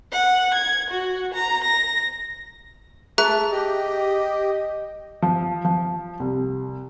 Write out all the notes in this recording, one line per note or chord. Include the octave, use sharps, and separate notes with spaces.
F#5
G#6
F#4
A#5
A#6
A3 G#4 E5 A#5 F#6
G4 D#5
F3
F3
C2